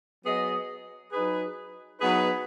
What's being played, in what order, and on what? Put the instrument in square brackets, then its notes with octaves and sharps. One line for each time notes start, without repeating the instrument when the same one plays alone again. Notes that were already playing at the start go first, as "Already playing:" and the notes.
[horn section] F#3 B3 G#4 D#5
F#3 D#4 G#4 B4
F#3 B3 D#4 G#4 B4